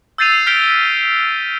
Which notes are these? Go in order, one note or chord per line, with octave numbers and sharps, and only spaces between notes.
E6 G6 A6 C7 D#7 F7
F6 G6 B6 D7 F7 G7